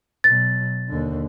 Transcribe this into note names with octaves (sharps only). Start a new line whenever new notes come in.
B2 F#3 A6
D#2 D3